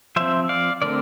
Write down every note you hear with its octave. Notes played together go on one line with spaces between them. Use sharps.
F3 C4 C5 E5
D5 F5
D3 A3 C4 A#4 D5